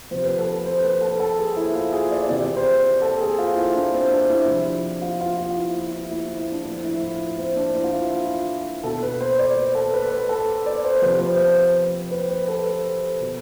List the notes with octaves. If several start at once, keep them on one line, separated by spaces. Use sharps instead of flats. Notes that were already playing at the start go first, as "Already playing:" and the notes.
C3 F3 C5
B4
A4
A4
C5
B4
A4
A4
G#4
E4
F4
G#4
D5
C3 E3 D5
C5
A4
G#4
F4
E4
D4
C4
D4
E4
C3 F3
F4
F4
F4
E4
E4
E4
E4
E4
E4
D4
A2 F3 C4
E4
F4
C4
D4
E4
F4
E4
F4
B2 A4
B4
C5
D5
C5
A4
B4
B4
A4
D5
C5
C3 F3 B4
C5
C5
B4
B4
A4
B2